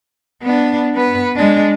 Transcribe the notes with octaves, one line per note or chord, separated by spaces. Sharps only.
B3 D4
B3 B4
G#3 D4